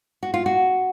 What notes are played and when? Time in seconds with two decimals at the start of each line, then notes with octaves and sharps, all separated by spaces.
0.23 F#4
0.34 F4
0.46 F#4